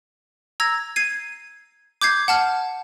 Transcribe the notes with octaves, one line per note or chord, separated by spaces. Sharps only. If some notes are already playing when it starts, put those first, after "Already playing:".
A#5 E6 G#6 A#6
G#6 C7 D#7
D6 G6 G#6 C7
F#5 A5 F6